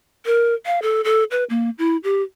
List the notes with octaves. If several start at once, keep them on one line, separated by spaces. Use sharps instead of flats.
A#4
F5
A4
A4
B4
A#3
E4
G4